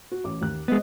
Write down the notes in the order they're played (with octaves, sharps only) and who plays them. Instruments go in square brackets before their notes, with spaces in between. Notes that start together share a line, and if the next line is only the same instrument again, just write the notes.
[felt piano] F#4
A1 D6
D#2 F#6
[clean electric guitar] G#3 B3 [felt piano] C5 D#5